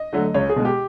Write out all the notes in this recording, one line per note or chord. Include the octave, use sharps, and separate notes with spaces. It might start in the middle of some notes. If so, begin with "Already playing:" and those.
Already playing: D#5
D3 F#3 A3
C#2 C#5
G#4
B2 G#3
G4